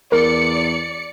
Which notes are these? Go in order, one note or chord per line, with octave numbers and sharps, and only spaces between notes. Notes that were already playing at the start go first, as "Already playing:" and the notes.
E2 A#4 D5 C#7